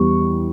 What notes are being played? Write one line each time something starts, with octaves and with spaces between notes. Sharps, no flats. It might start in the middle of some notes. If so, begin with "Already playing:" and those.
Already playing: E2 G3 C#6